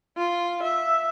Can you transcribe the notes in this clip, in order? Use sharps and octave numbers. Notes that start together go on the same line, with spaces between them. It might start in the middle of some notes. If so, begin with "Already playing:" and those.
F4
E5